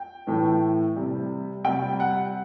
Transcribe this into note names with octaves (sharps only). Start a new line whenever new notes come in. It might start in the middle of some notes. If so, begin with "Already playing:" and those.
Already playing: G5
A2 E3 A3
C3 G3
C3 G3 G5
F#5